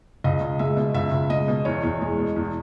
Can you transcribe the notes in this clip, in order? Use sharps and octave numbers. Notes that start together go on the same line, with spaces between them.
C#2 D#5
C#2
G#3 E5
B2
C#2 E5
C#2
G#3 D#5
B2
E2 C#5
E2
G#3
B2
E2